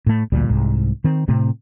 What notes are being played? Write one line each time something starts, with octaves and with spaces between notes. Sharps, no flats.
A2 A3
A1 D2 A#2 G3
C2 G#2
D#3 C4
A2 C3 A3 C4